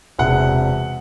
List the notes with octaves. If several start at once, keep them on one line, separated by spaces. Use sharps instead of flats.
E1 E2 C3 F#5